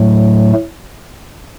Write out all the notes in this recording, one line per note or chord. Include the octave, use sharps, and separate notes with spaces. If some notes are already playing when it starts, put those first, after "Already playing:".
Already playing: A2 F#3 A3